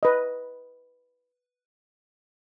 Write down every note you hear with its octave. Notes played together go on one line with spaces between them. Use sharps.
B4 D#5